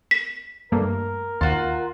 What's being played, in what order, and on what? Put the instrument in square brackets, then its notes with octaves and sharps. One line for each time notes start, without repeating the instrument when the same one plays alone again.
[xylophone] B6
[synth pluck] G2 A3 A#3 [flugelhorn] A#4
[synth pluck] D#2 [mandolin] F4 F#4